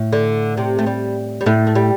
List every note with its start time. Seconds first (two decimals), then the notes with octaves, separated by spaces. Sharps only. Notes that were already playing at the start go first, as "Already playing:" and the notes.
Already playing: A2
0.12 D3
0.57 C3
0.79 A3
0.86 G3
1.41 G3
1.46 A2 A3
1.67 A3
1.75 G3